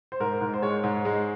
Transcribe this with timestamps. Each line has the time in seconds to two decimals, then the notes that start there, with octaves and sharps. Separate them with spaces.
0.12 C5
0.20 G#2 A#4
0.41 G#2
0.54 C5
0.62 G#3 C#5
0.83 G#2
1.05 G#3